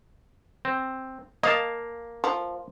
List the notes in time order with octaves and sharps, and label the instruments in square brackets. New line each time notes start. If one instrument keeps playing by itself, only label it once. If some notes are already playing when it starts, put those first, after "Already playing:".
[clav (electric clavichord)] C4
[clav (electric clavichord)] A#3 F5 A5 [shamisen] D#5
[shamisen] F3